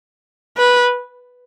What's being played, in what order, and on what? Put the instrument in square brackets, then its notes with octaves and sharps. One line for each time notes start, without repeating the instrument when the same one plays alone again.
[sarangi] B4